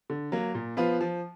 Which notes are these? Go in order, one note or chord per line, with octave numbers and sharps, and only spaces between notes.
D3
F#3 A#3
A#2
F3 B3 F4 B4
F3